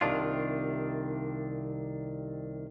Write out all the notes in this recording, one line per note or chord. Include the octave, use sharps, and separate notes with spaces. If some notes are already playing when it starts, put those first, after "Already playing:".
C2 C3 D#3 D4 F4